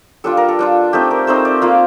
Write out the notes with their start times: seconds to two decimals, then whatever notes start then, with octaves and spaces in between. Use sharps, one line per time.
0.24 G3 D4 F4 A4
0.37 A#4
0.49 A4
0.59 G3 D4 F4
0.93 A3 C4 D#4 G4
1.11 A#4
1.27 A3 C4 D#4 C5
1.45 D5
1.62 A#3 F4 F5